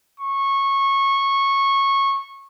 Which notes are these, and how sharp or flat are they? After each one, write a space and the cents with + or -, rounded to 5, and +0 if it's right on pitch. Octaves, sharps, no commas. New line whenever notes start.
C#6 -15